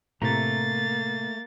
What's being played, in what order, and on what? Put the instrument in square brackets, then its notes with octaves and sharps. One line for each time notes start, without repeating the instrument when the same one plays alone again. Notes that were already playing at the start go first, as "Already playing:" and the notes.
[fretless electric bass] A2 C3 [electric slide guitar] A3 A#5 [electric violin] A#3 A6